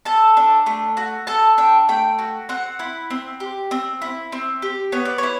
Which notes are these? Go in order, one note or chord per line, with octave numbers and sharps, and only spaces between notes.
A4 A5
D4
A3
F#4
A4 A5
D4 G5
A3 G5
F#4
C4 F#5
E4
C4
G4
C4
E4
C4
G4
B3 C#5
D5
E4 C#5